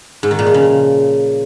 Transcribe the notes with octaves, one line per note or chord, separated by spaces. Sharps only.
G#2
D#3
A#2
F3
C#3